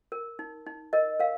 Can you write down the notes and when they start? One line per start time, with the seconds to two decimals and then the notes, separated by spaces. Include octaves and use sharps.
0.12 A#4
0.39 D#4
0.66 D#4
0.93 A#4 D#5
1.20 A#4 F5